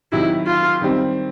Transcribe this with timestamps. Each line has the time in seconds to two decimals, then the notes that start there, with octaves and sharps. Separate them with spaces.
0.12 C3 D#3 F#3 E4
0.47 F4
0.81 D#3 G3 C4